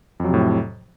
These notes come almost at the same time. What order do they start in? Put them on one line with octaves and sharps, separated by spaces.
F2 F#3 C3 A2